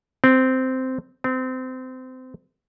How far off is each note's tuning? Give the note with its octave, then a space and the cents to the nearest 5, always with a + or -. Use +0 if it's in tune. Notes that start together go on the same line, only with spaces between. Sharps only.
C4 -10
C4 -25